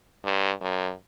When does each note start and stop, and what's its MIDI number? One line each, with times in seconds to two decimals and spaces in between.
0.24 0.52 43
0.61 0.92 42